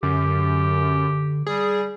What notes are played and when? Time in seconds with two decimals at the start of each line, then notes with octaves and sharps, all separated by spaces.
0.03 F#2 D3 G4
1.46 G3 G#4